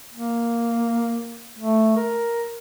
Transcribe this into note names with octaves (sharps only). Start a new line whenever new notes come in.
A#3
A3
A#4